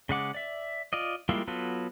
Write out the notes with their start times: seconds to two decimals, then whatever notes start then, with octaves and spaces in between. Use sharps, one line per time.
0.09 C#3 G#3 F#5 D6
0.34 D5 E5
0.93 F4 D5 D#5
1.29 G3 G#3 A#3 E4 F4
1.47 F#3 B3 F4 F#4 A4